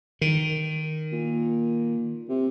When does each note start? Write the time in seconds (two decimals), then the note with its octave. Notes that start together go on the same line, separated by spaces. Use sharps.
0.21 D#3
1.12 A#2
2.29 C3